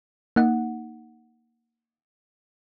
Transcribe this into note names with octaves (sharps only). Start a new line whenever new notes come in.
A#3 D#4 F#5